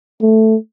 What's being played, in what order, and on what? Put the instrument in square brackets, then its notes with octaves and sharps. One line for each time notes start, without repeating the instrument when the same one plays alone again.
[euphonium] A3